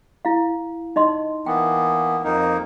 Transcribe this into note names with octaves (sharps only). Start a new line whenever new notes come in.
E4 F5
D#4 D#5 C6
E3 A#3 B3 G5
F2 A#3 D#4